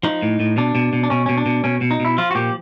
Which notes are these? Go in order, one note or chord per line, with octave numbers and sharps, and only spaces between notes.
F3 D#4
A2
A2
B2 D4
B2
B2
D4
B2 C#4
B2 C#4
D4
B2
B2 C#4
B2
D#4
B2 E4
F3 F4
F#4
A#2 G4